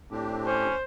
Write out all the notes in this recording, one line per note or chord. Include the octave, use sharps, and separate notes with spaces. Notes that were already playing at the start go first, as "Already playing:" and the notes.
A2 C4 D4 G4
C#4 C5